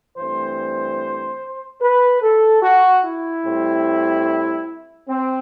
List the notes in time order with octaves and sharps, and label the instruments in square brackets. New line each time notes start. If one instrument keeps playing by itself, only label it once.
[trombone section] G2 E3 A3 C4 C5
B4
A4
F#4
E4
A2 G3 C4
C4